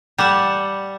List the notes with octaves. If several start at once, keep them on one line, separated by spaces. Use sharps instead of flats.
G3 F#5 A5